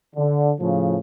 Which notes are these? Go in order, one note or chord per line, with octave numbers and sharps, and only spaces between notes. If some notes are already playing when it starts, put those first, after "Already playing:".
D3
A2 C#3 F3